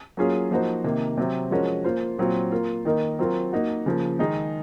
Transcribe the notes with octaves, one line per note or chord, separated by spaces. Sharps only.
F#3 A#3 C#4 F4 G#4
F3 A#3 D#4 F#4 C5
C3 D#3 A#3
C3 F#3 C4
F3 G#3 C#4 F#4 A#4
A#3 F4 C5
A#2 F#3 C4 F4
A#3 F4 A#4
D#3 A#3 D#4 A#4
F#3 C4 F4 A#4
A#3 D#4 F#4
C#3 F3 A#3
D#3 G#3 D#4 G#4